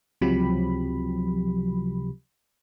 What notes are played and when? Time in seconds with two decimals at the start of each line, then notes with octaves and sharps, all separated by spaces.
0.21 C#2 C3 F3 F#3 G4 B5